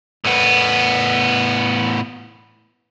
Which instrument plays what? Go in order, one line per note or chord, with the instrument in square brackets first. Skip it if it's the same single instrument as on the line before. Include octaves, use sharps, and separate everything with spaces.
[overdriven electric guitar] A2 B3